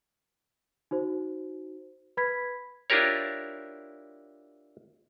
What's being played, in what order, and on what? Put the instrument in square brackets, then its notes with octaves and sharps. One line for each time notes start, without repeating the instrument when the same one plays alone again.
[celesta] D#4 F#4 C5
B4 B5 G#6 B6
[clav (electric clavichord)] D4 E4 F4 G4 A#4 C#5